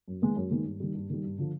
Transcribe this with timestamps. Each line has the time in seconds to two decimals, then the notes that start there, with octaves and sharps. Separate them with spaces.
0.08 F#2
0.22 D#3 G#3 B3
0.36 F#2
0.51 D#3 G#3 B3
0.65 G2
0.80 D#3 G3
0.95 G2
1.10 D#3 G3
1.24 G2
1.38 D3 F3